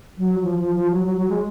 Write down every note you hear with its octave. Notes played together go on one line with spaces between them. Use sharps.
F#3
F3
F3
F3
F#3
F#3
F#3
G#3